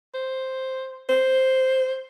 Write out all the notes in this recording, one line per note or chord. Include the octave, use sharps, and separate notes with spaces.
C5
C5